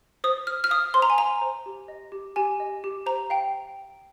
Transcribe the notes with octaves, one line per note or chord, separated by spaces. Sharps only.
C5 D#6
C5 F6
F6
F5 D#6
C5 C6
A#5
G#5
F5 A#5
C5
G4
D#5
G4
G4 G#5
D#5
G4
C5 A#5
F5 G5